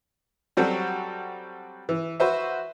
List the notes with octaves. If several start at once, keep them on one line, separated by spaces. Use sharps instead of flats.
F#3 G3 C4 F#4 A4
E3
F#4 B4 C5 E5